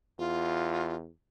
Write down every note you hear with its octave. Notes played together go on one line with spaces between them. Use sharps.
E2 F4